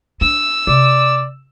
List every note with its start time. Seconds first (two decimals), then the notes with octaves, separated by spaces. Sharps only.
0.21 D4 E6
0.67 C3 D5